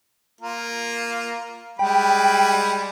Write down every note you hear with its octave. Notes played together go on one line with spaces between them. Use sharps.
A#3 F4 A#4
G3 G#3 G5 B5